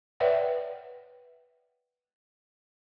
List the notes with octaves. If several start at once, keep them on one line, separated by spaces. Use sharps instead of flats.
B4 C#5 D5 E5 F#5 G5